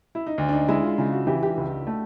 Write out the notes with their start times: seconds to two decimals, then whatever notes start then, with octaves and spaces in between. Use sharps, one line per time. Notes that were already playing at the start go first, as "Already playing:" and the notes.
0.15 E4
0.27 D#4
0.38 D2 D4
0.49 D4
0.53 D#4
0.68 G#3 E4
0.83 F4
0.98 C#3 F4
1.12 F#4
1.27 E3 G4
1.43 G4
1.57 C#2
1.87 A3